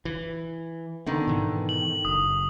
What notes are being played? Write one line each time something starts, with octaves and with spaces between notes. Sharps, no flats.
E3
D3 D#3 B3
G#2 B2 E3
F#7
F#1 D#6